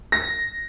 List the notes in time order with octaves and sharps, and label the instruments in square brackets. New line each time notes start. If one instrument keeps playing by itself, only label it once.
[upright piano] A#6